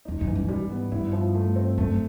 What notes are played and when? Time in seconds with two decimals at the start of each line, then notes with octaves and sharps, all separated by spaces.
0.05 F2 D#4
0.21 F#2
0.27 E3
0.35 G2
0.48 G#2 G3
0.70 B3
0.92 G2 E4
1.13 F3
1.35 A3
1.56 C4
1.78 F#2 A3